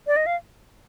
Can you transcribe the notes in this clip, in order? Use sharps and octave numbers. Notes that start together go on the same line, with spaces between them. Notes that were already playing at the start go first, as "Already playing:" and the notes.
D5
D#5
F5